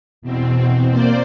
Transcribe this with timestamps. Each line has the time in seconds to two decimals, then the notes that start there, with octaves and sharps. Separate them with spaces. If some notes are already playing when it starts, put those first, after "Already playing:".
0.22 E2 B2 C4
0.90 A#3 C5 D5